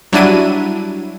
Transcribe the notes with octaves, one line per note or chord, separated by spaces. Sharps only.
F#3 G3 D4 E4 D#7